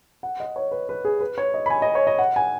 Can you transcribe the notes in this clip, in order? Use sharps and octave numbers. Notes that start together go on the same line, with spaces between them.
F#5
D#5
C#5
B4
B4
G#4
B4
C#5
D#5
B5
G#5
D#5
C#5
D#5
F#5
G#5